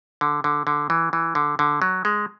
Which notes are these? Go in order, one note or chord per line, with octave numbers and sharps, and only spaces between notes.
D3
D3
D3
E3
E3
D3
D3
F#3
G#3